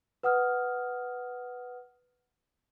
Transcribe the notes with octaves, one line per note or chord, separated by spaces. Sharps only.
B4 F#5 D#6 F6